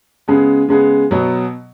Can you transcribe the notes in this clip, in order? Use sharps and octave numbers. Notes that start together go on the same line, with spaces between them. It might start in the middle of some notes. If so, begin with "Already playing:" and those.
C#3 G#3 B3 G#4
C#3 G#3 B3 G#4
B2 F#3 B3